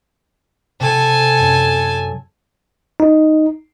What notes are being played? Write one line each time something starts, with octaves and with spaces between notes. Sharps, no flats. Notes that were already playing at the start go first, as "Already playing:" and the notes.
C3 A4 G#5
F#2
D#4